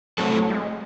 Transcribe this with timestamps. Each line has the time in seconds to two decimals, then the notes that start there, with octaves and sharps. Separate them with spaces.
0.18 F#3 A3 C4 E4 A4
0.36 F#3
0.50 G3
0.54 G#3